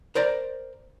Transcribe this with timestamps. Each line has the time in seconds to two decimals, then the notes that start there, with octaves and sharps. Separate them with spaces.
0.15 A#4 C5 D5 A#5